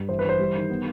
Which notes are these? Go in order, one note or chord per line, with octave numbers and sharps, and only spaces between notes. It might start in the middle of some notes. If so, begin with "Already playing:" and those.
Already playing: G2
E3 C5
B4
E3 C5
G3
D#3
B3